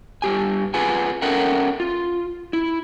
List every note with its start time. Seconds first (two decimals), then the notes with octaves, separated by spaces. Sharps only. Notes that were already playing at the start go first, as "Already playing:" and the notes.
0.22 G2 G4 G#5
0.74 F4 G#4 B4 F#5 G#5
1.22 C#4 A4 A#4 E5 F#5 G5
1.80 F4
2.53 E4